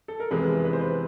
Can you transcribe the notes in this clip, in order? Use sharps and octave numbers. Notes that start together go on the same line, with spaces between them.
A4
A#4
F1 E2 C3 E3 G#3 B4
B4
C5
B4